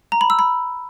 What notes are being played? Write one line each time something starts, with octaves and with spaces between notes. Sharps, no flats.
A#5
B5
E6
B5